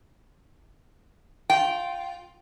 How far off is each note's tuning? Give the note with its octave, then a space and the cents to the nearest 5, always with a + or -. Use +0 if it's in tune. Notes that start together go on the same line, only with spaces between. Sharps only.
F4 +10 G5 -15